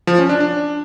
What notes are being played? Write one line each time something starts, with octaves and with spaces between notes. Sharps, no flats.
F3
C#4
D4
D4